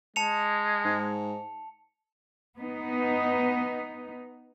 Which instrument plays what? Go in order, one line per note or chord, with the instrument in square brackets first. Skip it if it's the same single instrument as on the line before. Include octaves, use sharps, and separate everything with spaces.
[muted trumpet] G#3 [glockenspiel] A5 C#7 F7
[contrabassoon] G#2
[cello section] B3 D#4